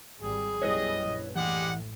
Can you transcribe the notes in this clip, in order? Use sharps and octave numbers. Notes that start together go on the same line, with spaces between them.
G#1 G3 G#4
B1 F#2 G3 E4 B4 C#5 D#5
A#1
A2 E3 G3 G#3 G4 F#5